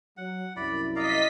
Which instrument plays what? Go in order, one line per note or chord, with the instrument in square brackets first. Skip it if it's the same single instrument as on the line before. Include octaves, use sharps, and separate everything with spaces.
[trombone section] F#3 [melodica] F#5
[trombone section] C2 F#2 E4 [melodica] D5 B5
[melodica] D5 F5 A#5 [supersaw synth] D#5 B6